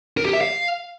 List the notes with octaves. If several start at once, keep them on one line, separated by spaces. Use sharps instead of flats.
A#4
G4
E5
F5